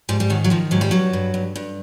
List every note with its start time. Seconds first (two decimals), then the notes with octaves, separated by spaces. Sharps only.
0.09 G#2 F3 G3
0.20 G3
0.30 D#3 F#3
0.44 F#3
0.50 D#3 F3
0.71 G#2 F#3
0.81 G3
0.91 G2 F#3
1.13 G2
1.34 G2
1.56 G2